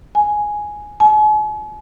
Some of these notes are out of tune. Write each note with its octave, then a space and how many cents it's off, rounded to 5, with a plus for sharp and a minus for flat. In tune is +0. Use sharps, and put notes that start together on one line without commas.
G#5 +5
G#5 +45